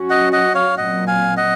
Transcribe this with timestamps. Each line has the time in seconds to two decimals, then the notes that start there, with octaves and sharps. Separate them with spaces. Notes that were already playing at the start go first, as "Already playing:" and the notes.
Already playing: F#3 C#4 F#4
0.10 D#5 F#5
0.33 D#5 F#5
0.55 C#5 F5
0.77 A#2 F#3 C4 D#5 F#5
1.07 F5 G#5
1.37 D#5 F#5